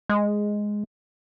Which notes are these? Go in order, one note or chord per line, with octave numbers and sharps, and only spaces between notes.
G#3